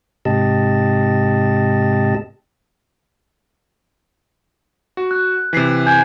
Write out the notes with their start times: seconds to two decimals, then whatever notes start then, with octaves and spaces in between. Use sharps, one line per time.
0.25 G#2 C3 G4 D#5 A5
4.97 F#4
5.11 F#6
5.53 C3 E3 B6 C7
5.86 G#5 G6 G#6